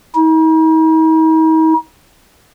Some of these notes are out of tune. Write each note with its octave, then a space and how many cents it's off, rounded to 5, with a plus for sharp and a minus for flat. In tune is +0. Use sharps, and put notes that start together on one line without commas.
D#4 +45